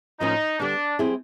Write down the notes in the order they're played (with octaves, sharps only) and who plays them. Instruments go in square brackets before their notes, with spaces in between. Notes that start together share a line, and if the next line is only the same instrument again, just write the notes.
[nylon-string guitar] A2 F3 A#3 C#4 [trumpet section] D#4
[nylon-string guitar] D3 G3 B3 [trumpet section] D4
[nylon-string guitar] G3 C4 E4 G#4